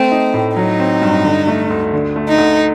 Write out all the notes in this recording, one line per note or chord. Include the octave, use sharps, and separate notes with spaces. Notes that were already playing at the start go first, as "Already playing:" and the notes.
Already playing: A3 C4
D#4
A2
F#3 D#4
C4
G2
D3
A3
D2
D3
A3
D#4
D2